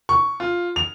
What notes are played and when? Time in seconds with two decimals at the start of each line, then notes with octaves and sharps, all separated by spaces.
0.09 C#6
0.40 F4
0.76 F7